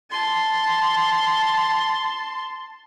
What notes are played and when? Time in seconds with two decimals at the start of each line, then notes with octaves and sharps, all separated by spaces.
0.10 A5 C6